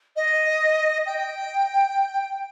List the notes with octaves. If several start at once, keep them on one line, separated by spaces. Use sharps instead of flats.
D#5
G5